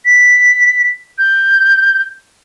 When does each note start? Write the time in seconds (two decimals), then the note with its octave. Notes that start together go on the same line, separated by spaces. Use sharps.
0.05 B6
1.18 G6